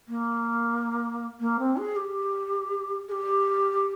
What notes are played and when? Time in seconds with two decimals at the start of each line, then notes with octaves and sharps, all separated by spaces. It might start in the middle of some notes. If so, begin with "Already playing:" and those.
0.08 A#3
1.40 A#3
1.59 C4
1.77 G#4
1.95 G4
3.08 G#4
3.11 G4